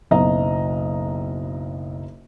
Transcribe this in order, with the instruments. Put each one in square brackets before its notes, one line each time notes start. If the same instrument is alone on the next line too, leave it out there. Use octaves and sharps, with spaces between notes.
[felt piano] F#1 B1 D#5 A#5